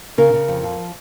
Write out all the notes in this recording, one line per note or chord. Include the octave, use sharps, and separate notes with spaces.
C#3 A#4
C#3
F2
F3